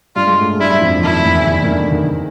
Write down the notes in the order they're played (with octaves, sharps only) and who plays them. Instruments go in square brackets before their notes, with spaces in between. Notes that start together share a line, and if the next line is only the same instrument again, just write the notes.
[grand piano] G2 G3 [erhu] F4
[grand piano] G#3
A2 A3
G#3
[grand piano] G2 G3 [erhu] E4
[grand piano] F2 F3
[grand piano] D#3 [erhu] E4
[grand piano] E2 E3
D#3
D#3
D3
D#3